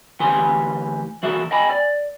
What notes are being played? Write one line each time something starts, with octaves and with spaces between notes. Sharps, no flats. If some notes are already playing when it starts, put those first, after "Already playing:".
D2 E3 G4 B4 G#5 C6
E3 F#4 A4 A#4 E5
D#5 G5 G#5 B5
D5